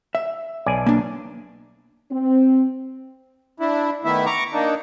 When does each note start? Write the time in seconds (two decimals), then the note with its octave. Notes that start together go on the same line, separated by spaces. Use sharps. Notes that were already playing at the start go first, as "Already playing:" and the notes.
0.15 E5
0.66 B1 D5 G#5
0.86 A#3 D4
2.12 C4
3.60 D4 E4
4.04 D#3 A3 B3 E4 E5
4.26 A#5 C#6 D6
4.53 A#3 D4 D#4